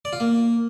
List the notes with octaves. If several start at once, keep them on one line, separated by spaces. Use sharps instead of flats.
D5
F4
A#3